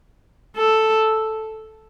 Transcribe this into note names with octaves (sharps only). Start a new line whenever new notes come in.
A4